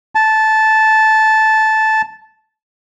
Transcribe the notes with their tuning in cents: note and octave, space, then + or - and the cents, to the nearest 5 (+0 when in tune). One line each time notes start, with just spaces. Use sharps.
A5 -10